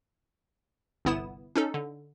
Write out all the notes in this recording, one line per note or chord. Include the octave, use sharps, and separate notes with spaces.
G1 C2 B3 E4 D#6 E7
C#4 D#4 A4
D3